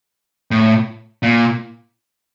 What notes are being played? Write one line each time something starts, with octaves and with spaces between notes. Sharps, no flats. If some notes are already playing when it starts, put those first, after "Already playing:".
A2
A#2